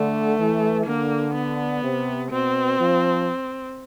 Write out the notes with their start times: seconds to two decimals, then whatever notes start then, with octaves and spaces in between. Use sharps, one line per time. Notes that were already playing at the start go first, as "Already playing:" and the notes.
Already playing: D3 A3
0.38 E3
0.86 D3 A#3
1.35 B3
1.84 C3
2.31 B2 C4
2.80 F3